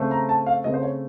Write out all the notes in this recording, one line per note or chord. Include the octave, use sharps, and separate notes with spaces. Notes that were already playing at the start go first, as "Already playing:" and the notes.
Already playing: C#3 A3 C4
A#5
A5
F5
C#3 A3 C4 D#5
C5
C#5